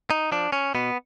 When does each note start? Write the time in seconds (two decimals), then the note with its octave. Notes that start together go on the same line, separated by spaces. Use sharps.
0.10 D#4
0.32 F3 D4
0.52 C#4
0.75 B2 B3